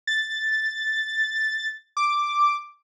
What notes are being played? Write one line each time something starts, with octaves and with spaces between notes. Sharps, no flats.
A6
D6